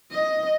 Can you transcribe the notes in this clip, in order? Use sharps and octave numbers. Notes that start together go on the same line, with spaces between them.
D#5